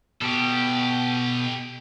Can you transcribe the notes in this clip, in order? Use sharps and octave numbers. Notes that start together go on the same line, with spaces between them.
B2 G4 A4